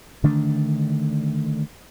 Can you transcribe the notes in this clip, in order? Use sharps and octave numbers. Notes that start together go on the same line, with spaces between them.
D3 D#3 A3 D4